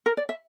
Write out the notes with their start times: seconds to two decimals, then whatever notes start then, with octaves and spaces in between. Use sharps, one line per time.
0.06 A#4
0.17 D5
0.29 E5